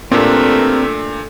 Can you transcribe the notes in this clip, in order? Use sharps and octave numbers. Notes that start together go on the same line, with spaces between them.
A#2 E3 A3 C4 D4 G4 A#4 F#6